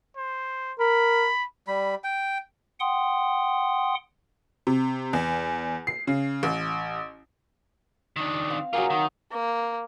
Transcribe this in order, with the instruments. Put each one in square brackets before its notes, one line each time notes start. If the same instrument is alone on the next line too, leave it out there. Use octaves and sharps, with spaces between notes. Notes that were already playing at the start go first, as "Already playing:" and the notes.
[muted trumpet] C5
[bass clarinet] A#4 [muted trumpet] B5
[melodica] G3 B5
G5
[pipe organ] F#5 G5 C6 D#6
[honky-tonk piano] C3
E2
C7
C#3
A1
[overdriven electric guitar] D#3 D4
[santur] C4 F5
[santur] F#3 A#3 [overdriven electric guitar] F4 G#4
[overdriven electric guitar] D#3
[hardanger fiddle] A#3